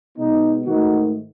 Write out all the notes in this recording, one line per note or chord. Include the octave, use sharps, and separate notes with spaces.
B2 G#3 B3 D#4
G#2 D#3 A3 D#4 F#4